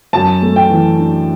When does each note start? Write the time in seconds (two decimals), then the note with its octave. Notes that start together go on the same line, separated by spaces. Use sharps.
0.13 F#2 A5
0.42 A3
0.56 G5
0.70 E3
0.98 D4